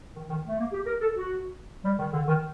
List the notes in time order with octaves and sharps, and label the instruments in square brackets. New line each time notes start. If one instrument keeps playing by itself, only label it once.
[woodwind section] D#3
D#3
A3
A#3
G4
A#4
A4
F#4
G3
D#3
D3
D#3